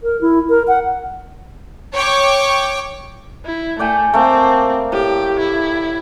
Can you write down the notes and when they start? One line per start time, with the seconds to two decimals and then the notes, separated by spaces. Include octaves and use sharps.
0.03 A#4
0.21 E4
0.49 A#4
0.68 F#5
1.94 C#5 G5 C#6 D6
3.45 E4
3.79 A3 D5 G5 G#5
4.14 A3 A#3 C4 F5
4.92 A2 G4
5.39 E4